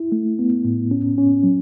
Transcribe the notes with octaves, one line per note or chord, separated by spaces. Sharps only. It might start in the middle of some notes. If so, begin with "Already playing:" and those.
Already playing: E4
A3
B3
A2
C#4
C#4
F#3